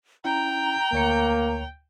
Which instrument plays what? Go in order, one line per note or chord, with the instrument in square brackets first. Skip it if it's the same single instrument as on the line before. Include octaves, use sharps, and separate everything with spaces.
[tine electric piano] C#4 E4 [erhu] G5 [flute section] A#5
[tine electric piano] D2 C#5 C#7 [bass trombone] A#3